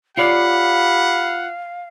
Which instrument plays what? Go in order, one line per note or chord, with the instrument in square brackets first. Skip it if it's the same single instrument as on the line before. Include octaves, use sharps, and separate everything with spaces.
[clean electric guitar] F4 C#5 D5 [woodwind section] G4 B5 [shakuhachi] F5 [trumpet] F#5